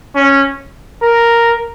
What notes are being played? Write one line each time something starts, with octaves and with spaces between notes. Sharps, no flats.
C#4
A#4